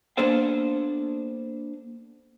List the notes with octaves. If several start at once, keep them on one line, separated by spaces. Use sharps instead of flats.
A#3 B3 D4 A4 C5 F5